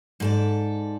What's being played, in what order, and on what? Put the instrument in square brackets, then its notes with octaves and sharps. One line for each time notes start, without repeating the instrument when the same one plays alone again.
[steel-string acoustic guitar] G#2 A4 D5